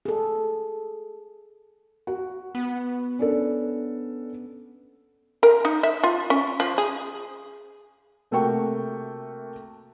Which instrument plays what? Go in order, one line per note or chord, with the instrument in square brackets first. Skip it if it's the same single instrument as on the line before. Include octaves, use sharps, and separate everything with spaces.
[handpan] G#4 A4
[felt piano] F#4
[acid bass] B3
[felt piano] C#4 D4 A4
[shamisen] A#4
D#4
E5
F4
C#4
F3
G#4
[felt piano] C3 A3 A#3 F#4 G5 C#6